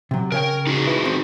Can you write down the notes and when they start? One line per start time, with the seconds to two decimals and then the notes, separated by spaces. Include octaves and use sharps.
0.11 C3 F#3
0.32 C#3 A#4 C#5 G5
0.67 D#4 F#4 G#4
0.87 E4 B4
1.05 C4 C5